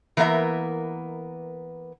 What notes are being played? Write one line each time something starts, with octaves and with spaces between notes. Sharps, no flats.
E3 A#3 B3 A#4 E5